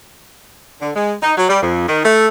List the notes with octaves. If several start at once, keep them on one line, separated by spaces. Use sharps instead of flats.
D3
G#3
D#4
F#3
G3
F2
D#3
A3